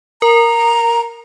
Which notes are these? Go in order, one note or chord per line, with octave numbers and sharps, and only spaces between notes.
A#4 A#5